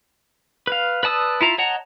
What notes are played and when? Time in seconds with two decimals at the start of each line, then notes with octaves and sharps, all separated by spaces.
0.67 B4 F5
1.03 B4 D5 A5 D#6 E6
1.41 E4 F4 A#5
1.58 C#5 D#5 F#5 A5 A#5